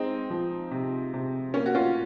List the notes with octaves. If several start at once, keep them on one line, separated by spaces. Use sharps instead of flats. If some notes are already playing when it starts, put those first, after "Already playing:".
Already playing: G#3 C4 D#4
F3
C3
C3
A#3 C#4
F#4
C#4 F4